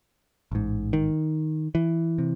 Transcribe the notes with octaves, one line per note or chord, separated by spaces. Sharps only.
A1 G#2
D#3
E3
C3